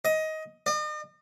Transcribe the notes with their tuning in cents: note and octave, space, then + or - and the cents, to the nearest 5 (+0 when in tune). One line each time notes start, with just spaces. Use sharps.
D#5 +15
D#5 -45